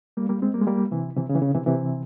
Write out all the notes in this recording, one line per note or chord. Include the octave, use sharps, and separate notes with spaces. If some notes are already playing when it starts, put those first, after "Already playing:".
G3 A#3
G3 A#3
G#3 C4
G3 A#3
G#3
G3 A#3
C3 E3
C3 E3
C#3
E3
C#3
C3 E3
C3 E3